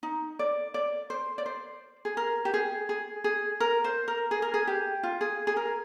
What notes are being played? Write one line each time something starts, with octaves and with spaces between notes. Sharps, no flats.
D#4
D5
D5
C5
D5
C5
G#4
A#4
G4
G#4
G#4
G#4
A#4
C5
A#4
G#4
A#4
G#4
G4
F4
G#4
G#4
A#4